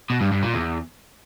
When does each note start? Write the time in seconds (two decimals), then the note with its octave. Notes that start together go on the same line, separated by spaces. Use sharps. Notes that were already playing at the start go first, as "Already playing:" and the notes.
0.10 B2
0.21 G2
0.32 G2
0.43 A#2
0.54 E2